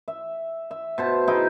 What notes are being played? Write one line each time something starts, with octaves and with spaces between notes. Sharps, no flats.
E5
E5
B2 C5 A5
D#4 E4 G#4 G5